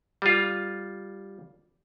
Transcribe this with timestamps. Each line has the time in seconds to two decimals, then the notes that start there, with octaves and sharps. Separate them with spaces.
0.22 G3 F4